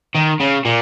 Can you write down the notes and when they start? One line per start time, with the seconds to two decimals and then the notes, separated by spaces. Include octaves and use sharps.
0.15 D#3
0.40 C#3
0.65 A#2